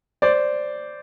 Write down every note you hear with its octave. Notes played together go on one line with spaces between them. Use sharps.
C5 D5